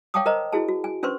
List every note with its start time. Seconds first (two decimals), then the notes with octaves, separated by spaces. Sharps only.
0.14 C#5 F5 G5 A5 D6 D#6
0.26 A#4 C5 D#5 A#5
0.53 E4 F#4 G#4 A5
0.68 F#4
0.84 G#5
1.03 C#4 D4 B4 C5 C6 C#6